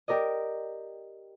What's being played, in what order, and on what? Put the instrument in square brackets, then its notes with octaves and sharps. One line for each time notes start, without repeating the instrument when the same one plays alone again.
[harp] G4 A#4 D5 D#5